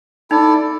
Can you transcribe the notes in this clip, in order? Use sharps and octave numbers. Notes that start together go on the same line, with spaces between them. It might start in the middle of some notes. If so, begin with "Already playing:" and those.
D#4 E4 A4 D5